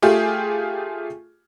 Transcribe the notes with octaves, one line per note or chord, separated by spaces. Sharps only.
A3 F4 G4 G#4